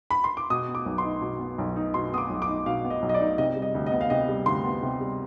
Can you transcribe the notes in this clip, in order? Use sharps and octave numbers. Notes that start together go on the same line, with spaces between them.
B5
C6
D6
B2 D#6
B3
D6
B1
C6
D#4
B2
B3
B1
D#4
B2 C6
B3 D#6
D6
B1
D6
D#4
B2 F5
B3
D#5
B1
D#5
D5
D#4
C3 D#5
G3
D#5
D2
D#5
B3
F5
C3 D#5
G3
D2 C6
B3
C3
G3